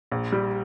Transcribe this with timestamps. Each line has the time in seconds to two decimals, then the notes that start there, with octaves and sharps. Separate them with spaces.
0.11 A#1
0.32 G3